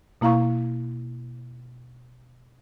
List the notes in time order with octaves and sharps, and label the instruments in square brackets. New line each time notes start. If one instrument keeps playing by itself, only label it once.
[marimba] B2 A#3 E4 F5 A#5 C#6